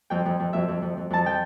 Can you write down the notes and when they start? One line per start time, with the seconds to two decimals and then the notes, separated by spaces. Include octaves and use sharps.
0.10 F2 G5
0.25 F2
0.40 F2
0.53 F2 E5
0.68 F2
0.82 F2
0.97 F2
1.10 F2 A5
1.24 F3 G5